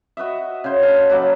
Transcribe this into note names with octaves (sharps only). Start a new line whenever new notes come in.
F#4 B4 D#5 E5
C#3 C5
A4 B4 F5
F#3 A#3 A4 B4